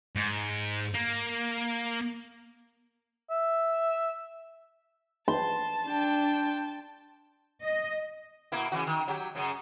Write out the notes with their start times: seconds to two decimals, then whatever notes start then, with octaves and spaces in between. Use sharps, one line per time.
0.16 G#2
0.94 A#3
3.31 E5
5.28 A5 C6
5.87 D4 G5
7.62 D#5
8.52 B2 A#3 E4
8.72 C#3 E3 F#4
8.87 D#3
9.08 F#3 G4
9.35 F#2 C#3